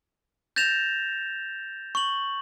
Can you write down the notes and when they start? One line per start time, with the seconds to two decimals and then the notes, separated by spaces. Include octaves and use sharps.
0.56 G6 A6 A#6 E7 F7
1.95 C#6 F#7